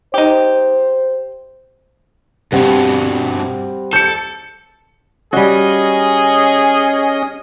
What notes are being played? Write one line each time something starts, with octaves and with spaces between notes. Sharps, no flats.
D#4 G4 C5
G2 B2 G3 C4 F#5
A4 G6 C#7
G3 C#4 F#4 G#4 D#5